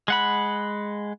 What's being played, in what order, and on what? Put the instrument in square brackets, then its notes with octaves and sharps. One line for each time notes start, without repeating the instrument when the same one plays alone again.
[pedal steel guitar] G#3 F#5 B5